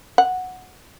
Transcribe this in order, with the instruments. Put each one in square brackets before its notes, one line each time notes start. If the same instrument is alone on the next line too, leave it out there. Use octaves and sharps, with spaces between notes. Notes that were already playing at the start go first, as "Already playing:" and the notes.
[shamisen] F#5